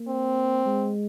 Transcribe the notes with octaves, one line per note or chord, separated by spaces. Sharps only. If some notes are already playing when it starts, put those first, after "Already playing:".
Already playing: A#3
C4
G#3